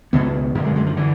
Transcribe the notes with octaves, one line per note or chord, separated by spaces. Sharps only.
C#2 B2 B3
F#2 D3 A#3
G#3
G#3
F3
D3 E3